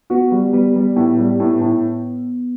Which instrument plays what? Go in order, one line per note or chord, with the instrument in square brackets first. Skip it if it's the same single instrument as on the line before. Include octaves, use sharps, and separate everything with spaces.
[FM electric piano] B3 [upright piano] F#4
[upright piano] G3
[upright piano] G3 [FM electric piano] B3
[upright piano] G3
[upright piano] A2 [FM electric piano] B3
[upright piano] G3
[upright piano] A2 [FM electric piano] B3
[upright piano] A2